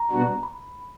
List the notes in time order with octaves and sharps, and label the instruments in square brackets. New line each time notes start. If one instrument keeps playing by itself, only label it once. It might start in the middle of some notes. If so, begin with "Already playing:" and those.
Already playing: [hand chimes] A#5
[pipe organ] B2 G3 B3 D4 F#4
[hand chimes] B5